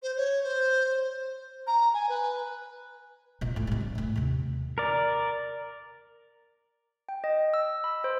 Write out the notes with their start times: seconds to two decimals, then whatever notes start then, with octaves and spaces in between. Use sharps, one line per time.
0.02 C5
0.17 C#5
0.43 C5
1.67 A#5
1.94 G#5
2.09 B4
3.41 A#2 F3
3.56 A2 A3
3.67 C2 G3
3.80 A#1
3.95 A2 A3
4.16 D#2 C3
4.78 A#4 D5
7.09 G5
7.24 D#5
7.54 E6
7.84 B5
8.04 C5